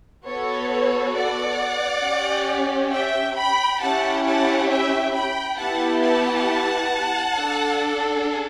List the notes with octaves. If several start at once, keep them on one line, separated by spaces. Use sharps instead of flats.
B3 F#4 A4 C#5
D5 F#5
C#4 G4
E5 G5
G5 B5
C#4 E4 G4 F#5 A5
F#5 A5
E5 G5
G5 B5
B3 E4 G4 F#5 A5
F#5 A5
D4 A4